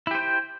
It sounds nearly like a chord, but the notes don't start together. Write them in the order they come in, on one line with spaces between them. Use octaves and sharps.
E4 G4 C5 G5